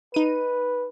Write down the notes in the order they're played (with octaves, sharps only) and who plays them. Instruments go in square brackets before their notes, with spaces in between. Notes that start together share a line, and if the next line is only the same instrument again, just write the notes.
[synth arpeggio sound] D#4 D#7 [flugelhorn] B4